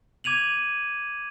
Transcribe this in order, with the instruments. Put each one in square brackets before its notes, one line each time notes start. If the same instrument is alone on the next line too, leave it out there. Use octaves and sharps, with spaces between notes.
[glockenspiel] D6 G#6 D#7 F7 F#7